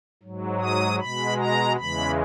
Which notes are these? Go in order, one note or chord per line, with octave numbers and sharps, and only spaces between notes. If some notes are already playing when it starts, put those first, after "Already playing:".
G#2 F#3
D#6
B2 G#3 B5
A#5
E2 C#3 E3 G#3 B5